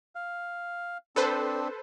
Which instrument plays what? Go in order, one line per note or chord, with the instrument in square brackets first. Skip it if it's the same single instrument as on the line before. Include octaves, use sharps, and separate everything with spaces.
[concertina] F5
[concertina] C4 D4 [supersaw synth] A4 B4 C5